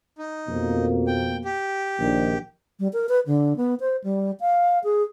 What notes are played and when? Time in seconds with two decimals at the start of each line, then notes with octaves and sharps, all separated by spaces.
0.18 D#4
0.48 F2 B2 A#3
1.07 G5
1.45 G4
1.99 A#1 D#3
2.80 G3
2.93 A#4
3.09 B4
3.27 D3
3.57 B3
3.80 C5
4.04 G3
4.40 F5
4.84 G#4